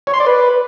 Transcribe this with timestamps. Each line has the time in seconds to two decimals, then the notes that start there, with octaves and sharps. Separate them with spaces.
0.07 C#5
0.14 C6
0.20 D5
0.26 B4